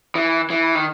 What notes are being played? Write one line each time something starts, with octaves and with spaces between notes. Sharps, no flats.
E3
E3
D#3